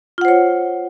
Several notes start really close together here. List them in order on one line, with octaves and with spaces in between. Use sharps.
F4 F#5 C5 C#5